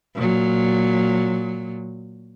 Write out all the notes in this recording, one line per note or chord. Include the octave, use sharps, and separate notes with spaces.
A#2 F#3